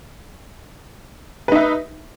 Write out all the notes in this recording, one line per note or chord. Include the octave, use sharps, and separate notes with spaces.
D#4 B4 E5